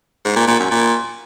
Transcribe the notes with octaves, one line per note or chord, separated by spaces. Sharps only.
G#2
A#2
A#2
F#2
A#2